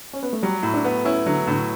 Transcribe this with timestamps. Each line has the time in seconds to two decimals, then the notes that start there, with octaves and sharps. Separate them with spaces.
0.13 C#4
0.23 B3
0.33 A3
0.43 F#3 G3
0.63 A2 E4
0.74 D4
0.85 B3
1.05 C#4 E4
1.26 D3 F#3
1.47 A2 D3